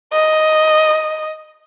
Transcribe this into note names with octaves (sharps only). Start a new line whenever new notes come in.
D#5